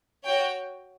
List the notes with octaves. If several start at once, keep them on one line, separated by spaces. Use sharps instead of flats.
F#4 C#5 G5